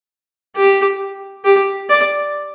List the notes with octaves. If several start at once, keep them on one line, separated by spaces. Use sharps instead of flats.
G4
G4
D5